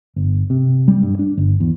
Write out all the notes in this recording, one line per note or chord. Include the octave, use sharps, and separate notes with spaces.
G1
C3
G3
G2
D4
G1
E2